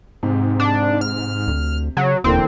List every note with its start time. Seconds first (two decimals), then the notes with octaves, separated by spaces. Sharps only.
0.23 G#2 C3
0.59 D4
1.01 F6
1.47 D2
1.97 C#3 F#3
2.24 E1 D#2 D3 E3 A#3 C4